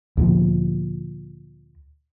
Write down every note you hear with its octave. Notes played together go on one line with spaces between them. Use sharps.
D2 A#2 F3